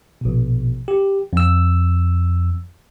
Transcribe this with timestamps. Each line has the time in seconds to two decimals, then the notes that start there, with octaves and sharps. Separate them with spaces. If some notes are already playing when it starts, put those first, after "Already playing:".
0.21 A#1 B2
0.88 G4
1.33 F2 E6